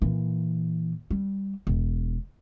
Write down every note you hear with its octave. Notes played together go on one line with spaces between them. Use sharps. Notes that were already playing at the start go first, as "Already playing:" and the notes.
A#2 E3
G3
E1